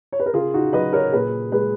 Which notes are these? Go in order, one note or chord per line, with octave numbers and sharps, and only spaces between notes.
C#5
B4
A#4
C#3 F4 G#4
D#4 F#4
F#3 B4 D#5
A#4 C#5
A#2 G#4 B4
G#3 G#4 B4